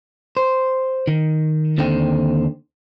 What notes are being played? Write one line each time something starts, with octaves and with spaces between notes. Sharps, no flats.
C5
D#3
D#2 D3 C4 D#4 G5